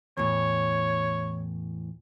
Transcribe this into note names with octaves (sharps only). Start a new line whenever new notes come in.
E2 A2 C#5